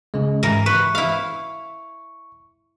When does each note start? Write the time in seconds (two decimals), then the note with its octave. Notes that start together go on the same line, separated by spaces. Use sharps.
0.14 C#3 G#3
0.43 G#2 E3 A#4
0.66 B4 C#6
0.95 E4 F5